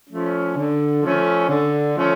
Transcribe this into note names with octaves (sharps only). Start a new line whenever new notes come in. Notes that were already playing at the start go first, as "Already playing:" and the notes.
F3 A3 C#4
D3
F3 A3 C#4
D3
F3 A3 C#4